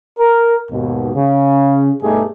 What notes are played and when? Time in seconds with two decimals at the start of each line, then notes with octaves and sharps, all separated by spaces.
0.19 A#4
0.71 D#2 G#2 B2
1.14 C#3
2.03 G2 B2 A3 D#4 G4 G#4